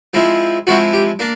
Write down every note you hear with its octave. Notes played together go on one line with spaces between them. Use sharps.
F3 G#3 C4 E4
F3 G#3 C4 E4 F#4
G4
A#3 D4